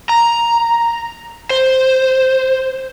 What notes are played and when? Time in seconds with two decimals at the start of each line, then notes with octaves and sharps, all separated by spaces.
0.09 A#5
1.50 C5